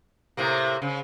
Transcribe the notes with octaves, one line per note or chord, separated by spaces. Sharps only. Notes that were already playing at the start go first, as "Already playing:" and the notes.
A2 C3 A#3
C#3